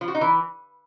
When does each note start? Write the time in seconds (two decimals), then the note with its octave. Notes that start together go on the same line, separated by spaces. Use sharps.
0.01 F3
0.08 F#4
0.15 D#4
0.21 E3